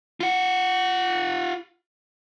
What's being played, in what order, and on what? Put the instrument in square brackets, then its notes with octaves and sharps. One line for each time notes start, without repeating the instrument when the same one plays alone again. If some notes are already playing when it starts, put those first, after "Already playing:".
[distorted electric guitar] F4 F#5